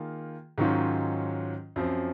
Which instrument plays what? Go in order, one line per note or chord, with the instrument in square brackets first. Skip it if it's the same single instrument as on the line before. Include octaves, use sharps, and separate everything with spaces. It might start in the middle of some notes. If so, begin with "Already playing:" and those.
Already playing: [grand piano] D#3 A#3 F4 G#4
G#2 D#3 F#3 C#4 F4
F#2 F3 C4